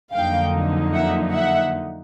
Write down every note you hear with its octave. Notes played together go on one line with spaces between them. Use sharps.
F2 D3 F#3 A#3 D#4 F5 G5
E5 F#5
E5 F#5